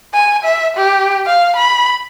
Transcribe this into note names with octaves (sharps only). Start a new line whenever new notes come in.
G#5
E5
G4
F5
B5